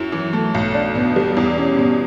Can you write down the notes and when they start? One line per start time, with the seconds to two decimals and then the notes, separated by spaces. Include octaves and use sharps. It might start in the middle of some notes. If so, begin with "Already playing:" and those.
Already playing: F#2 E4
0.12 E3
0.33 A3
0.55 B1
0.74 D4
0.95 B2
1.16 G3
1.37 E2
1.58 C#4
1.79 B2